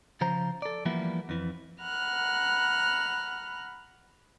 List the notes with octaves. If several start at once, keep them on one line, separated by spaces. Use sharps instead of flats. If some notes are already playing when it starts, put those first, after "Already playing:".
C#3 F3 C5 A#5
A4 D5
E3 F3 G3 A#3 B3 E4
F2 E3
F#5 A#5 B5 F6 F#6